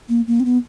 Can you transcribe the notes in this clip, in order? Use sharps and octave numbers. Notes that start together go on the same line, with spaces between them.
A#3
A#3
C4
B3